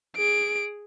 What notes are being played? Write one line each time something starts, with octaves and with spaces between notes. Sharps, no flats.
G#4 D7